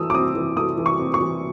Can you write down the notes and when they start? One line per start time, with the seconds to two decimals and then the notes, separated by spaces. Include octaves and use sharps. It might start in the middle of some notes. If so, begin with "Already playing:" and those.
Already playing: E3 A3 D#6 E6
0.10 D6
0.14 C4 D#6
0.35 E3
0.56 A3 D#6
0.78 E3
0.86 C#6
0.99 C4
1.14 C#6
1.21 E3